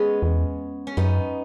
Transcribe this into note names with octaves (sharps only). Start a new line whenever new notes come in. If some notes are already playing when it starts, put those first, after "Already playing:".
Already playing: G#3 B3 C#4
E2
C#4
F#2 B3 D#4